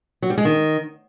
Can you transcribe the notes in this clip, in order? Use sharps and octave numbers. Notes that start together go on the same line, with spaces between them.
F#3
G3
G#3
D#3